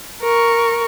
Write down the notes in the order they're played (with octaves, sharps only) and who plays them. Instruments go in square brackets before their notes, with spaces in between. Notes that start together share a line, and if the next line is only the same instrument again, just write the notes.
[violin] A#4 C#6